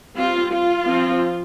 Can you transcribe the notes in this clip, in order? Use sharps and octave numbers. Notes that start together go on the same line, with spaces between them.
G3 C4 F4
F4
F3 C4